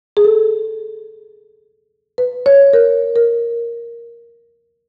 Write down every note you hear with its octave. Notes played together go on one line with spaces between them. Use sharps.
G#4
A4
B4
C#5
A#4
A#4